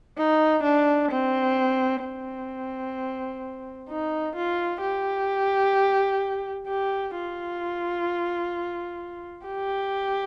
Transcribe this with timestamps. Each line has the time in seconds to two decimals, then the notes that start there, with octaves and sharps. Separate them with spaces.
0.18 D#4
0.64 D4
1.11 C4
2.04 C4
3.89 D#4
4.36 F4
4.82 G4
6.68 G4
7.15 F4
9.47 G4